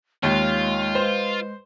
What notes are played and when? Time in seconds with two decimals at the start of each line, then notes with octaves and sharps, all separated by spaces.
0.23 D#2 G#3 F4 C#5
0.95 B4 C5 D#5